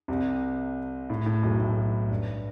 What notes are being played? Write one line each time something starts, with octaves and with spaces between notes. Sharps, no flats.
C2 C3
A2
A2
B1 B2
A2
G2